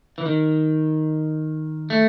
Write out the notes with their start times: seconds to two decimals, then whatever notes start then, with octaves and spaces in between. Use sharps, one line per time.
0.18 E3
0.26 D#3
1.90 A3